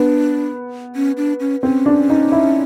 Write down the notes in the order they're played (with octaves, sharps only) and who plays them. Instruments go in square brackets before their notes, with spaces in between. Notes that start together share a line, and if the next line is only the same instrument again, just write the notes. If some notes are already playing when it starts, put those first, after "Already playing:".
Already playing: [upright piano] B3 [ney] D4
[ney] C#4
D4
C#4
[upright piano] C4 [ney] C#4
[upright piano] D4
D#4
E4